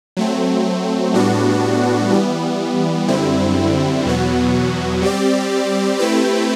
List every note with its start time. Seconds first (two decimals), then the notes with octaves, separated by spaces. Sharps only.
0.17 F#3 A3 C4
1.14 A2 G3 B3 D4 F#4
2.10 E3 G3 B3
3.08 F#2 D3 G3 C4 E4
4.05 E2 B2 F#3 B3 F#4
5.02 G3 C4 G4 D5
5.99 A3 C4 E4 G4 B4